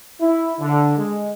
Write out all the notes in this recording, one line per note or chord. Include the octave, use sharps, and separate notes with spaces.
E4
D3
G#3